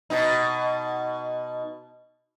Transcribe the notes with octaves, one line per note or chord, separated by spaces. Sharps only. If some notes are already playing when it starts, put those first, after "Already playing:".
B2 D#4